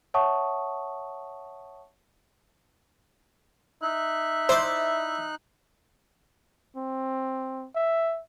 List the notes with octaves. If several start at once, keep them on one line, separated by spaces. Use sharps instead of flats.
C#5 E5 F#5 A5 C#6 D#6
D#4 E5 F#6
E4 C5 D5
C4
E5